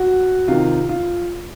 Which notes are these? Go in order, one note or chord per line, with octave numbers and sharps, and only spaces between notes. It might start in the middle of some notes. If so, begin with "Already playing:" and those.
Already playing: F#4
C3 D#3 F4
F4